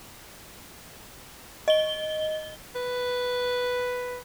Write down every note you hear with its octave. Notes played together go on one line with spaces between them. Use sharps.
D#5 G7
B4